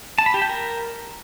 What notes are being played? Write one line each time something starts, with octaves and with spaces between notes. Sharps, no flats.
A5
B5
G4
G5
A#4